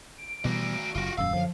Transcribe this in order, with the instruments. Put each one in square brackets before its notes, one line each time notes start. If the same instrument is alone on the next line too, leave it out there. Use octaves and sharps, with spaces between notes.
[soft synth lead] D7
[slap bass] B2 E3 G3 [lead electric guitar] F#4 D5
[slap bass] F#1 [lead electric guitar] F4 F#4
[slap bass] D#1 F#2 [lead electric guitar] F5 [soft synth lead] E6
[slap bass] F#2 D3 F#3 [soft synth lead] F3